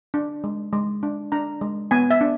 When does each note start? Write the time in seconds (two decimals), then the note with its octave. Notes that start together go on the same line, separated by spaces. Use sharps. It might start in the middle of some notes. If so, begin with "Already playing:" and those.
0.14 D4
0.44 G#3
0.73 G#3
1.03 D4
1.32 D4 A#5
1.61 G#3
1.91 B3 G#5
2.11 E5
2.21 D4